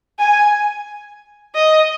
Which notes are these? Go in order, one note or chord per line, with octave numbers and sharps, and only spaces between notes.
G#5
D#5